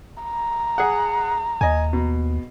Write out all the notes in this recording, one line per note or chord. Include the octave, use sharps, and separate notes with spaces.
A#5
G#4 F#5
D#2 D#5 G#5
B2